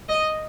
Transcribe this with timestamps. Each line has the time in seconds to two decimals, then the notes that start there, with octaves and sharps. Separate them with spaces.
0.09 D#5